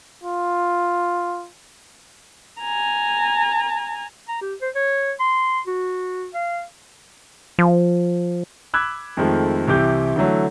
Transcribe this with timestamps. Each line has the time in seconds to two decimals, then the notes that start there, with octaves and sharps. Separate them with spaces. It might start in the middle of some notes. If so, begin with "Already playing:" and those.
0.24 F4
2.61 G#5 A#5
4.28 A#5
4.41 G4
4.61 C5
4.75 C#5
5.20 C6
5.67 F#4
6.34 F5
7.59 F3
8.74 B5 D6 E6 F#6 G#6
9.17 F2 D#3 F3 G#3 A3
9.68 C2 C3 E3 G4 D6 G6
10.16 D3 E3 F#3 A3